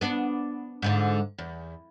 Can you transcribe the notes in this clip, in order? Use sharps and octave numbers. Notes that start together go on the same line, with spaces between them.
B3 D4
G#2 D3 F4
E2